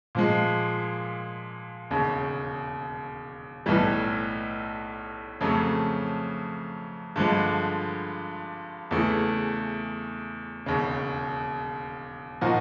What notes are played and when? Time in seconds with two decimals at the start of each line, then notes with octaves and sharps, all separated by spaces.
0.15 A#2 F3 G#3
1.91 E1 D#2 C#3
3.66 B1 A2 E3 G3
5.41 F2 C#3 F#3 A3
7.16 G2 D3 F3 G#3
8.91 E2 C#3 E3 A3
10.66 E1 D#2 C#3
12.41 A#2 F3 A#3 D#4 F#4